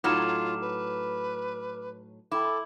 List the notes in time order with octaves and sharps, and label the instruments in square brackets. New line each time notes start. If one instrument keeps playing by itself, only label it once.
[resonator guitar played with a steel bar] A2 F#3 D#4 [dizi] F4 [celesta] D6 F6 E7
[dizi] B4
[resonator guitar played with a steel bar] E4 [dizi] A4 [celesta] G5 D6